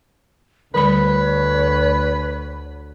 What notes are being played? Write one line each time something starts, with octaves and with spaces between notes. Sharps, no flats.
D2 D3 G3 B4 C#5 B5